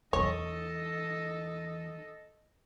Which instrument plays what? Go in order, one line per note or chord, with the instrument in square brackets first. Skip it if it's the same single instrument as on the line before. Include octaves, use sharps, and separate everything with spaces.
[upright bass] E2 E3 [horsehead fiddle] A4 D#5 [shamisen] C#5